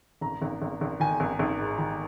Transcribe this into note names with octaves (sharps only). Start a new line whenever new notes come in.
G#1 A#5
G#1
G#1
G#1
D#3 G#5
G#1
G#1
G#2
D#3